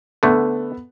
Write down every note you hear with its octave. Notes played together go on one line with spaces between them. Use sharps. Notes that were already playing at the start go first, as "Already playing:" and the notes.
D3 A3 B3 A4